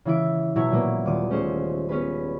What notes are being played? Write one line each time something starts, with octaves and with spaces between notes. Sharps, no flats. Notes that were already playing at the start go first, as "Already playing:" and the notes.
C#3 E3 E4 D7
B2 F#3 E4 C#5 A#5 G#6
A#2 F#3 A#3 B3
D#1 D6 D#6
A3 C#4 G#4 C5 D#5
B3 C#4 G#4 B4